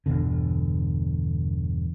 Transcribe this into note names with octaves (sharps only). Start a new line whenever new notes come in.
G1 E2 B2 D3